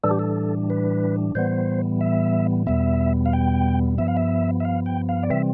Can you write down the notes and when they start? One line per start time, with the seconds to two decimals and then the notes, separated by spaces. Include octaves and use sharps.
0.04 A2 E3 G3 D4 A4
0.11 G4
0.19 A4
0.70 B4
1.35 A2 E3 G3 B3 C5
2.01 E5
2.66 E2 B2 G3 B3 E5
3.26 F5
3.33 G5
3.98 G2 F3 B3 E5
4.08 F5
4.17 E5
4.60 E5
4.65 F5
4.86 G5
5.09 F5
5.23 D5
5.30 C3 E3 G3 C4 E5